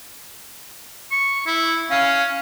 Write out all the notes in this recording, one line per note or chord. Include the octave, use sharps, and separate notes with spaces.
C#6
E4
C#4 F5